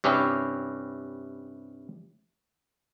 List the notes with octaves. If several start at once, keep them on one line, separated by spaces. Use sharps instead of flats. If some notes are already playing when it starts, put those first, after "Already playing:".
G2 C3 C#4 E4 G4